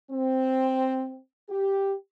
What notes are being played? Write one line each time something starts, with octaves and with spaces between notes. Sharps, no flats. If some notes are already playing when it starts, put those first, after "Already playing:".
C4
G4